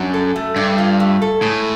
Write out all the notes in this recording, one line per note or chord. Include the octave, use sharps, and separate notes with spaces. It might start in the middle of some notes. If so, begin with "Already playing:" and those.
Already playing: F#2 D4
A4
A3
G2 D4
F4
A3
A4
A2 G#3